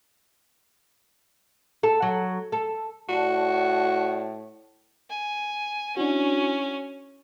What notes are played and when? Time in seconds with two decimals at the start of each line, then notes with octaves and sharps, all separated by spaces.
1.83 A4
2.02 F#3
2.52 A4
3.09 A2 F#4 D5 A5
5.10 G#5
5.97 C#4 D4 E4 F#4